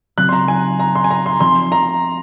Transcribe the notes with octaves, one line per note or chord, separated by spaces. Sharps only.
C#3 F#3 C4 F#6
C6
A#5
G#5
A#5
C6
G#5
A#5
C6
F3 C4 C6
A#5